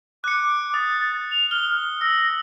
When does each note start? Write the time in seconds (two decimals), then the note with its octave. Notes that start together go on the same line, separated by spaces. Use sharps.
0.24 D6 F#6 C#7
0.74 D#6 A6
1.31 F7
1.51 F6 G7
2.01 E6 A#6